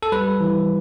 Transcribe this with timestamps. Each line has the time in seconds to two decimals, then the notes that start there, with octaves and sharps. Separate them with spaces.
0.03 A4
0.12 G3 B4
0.40 E3